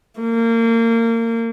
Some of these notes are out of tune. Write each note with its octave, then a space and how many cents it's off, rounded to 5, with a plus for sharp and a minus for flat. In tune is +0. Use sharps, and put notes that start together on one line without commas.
A#3 -30